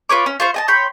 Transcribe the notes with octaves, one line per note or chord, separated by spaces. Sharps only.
F4 B4 C#5 D6
C#4
F4 C5 C#6
D#5 G#5 A5
C#5 G5 B5 C6